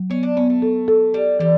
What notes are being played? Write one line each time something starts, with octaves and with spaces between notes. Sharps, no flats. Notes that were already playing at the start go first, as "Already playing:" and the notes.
Already playing: F#3
B3 C#4
D4
B3 C#4
A3
A4
A4
G3 G4
E3 G3